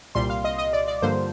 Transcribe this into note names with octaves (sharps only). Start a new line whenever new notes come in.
C2 A#2 G3 C6
F5
D#5
D#5
D5
D5
G2 D3 F3 A#3 C5